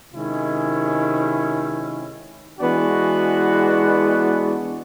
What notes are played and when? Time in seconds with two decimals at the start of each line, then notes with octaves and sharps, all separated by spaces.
0.12 C3 D#3 G#3 C#4 E4
2.59 E3 G#3 B3 D4 F#4